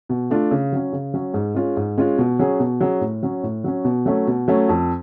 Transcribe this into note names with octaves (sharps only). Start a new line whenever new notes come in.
B2
A3 D4 F4
C#3
F#3 C#4
C#3
F#3 C#4
G#2
G#3 C#4 F4
G#2
G#3 C#4 F4
B2
F#3 C#4 G#4
B2
F#3 C#4 G#4
A2
F#3 C#4
A2
F#3 C#4
B2
F#3 A3 C#4
B2
F#3 A3 C#4
F2